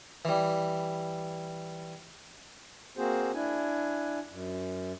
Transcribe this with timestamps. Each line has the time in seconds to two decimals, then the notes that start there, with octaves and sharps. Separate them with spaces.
0.25 E3 G3
2.97 A#3 C4 F#4 G#4 C5
3.34 D4 E4 G#5
4.30 F#2